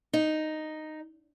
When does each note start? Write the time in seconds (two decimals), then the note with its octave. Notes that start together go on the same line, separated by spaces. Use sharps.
0.13 D#4